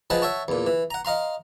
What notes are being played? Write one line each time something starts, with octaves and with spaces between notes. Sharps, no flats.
F3 G#4 B4 D#5 F#5 A5
C#5 E5 F#5 A5 C#6
E2 A#2
E3
F#5 A#5
D#5 F5 A#5 C6